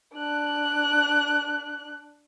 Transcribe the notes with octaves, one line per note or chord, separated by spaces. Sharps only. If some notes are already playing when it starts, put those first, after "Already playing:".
D4 F#6